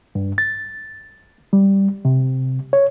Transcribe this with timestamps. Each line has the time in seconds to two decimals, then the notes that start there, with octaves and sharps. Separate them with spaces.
0.15 G2
0.38 A6
1.53 G3
2.05 C3
2.73 C#5